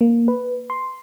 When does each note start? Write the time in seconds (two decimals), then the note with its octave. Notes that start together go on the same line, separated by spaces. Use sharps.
0.01 A#3
0.28 B4
0.70 C6